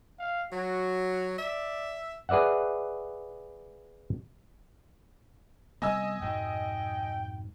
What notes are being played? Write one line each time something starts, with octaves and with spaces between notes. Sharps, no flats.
F5
F#3 F#4
D5 E5
G#4 B4 D5 E5 F#5
C3 G3 B3 D#5 G#5 E6
F2 G#2 B2 G5